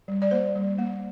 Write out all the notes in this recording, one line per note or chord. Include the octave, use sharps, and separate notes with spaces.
G3
D5
A#3 C5
G3
A#3